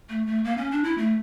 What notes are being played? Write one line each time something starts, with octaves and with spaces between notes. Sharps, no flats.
A3
A3
A#3
C#4
D4
E4
A3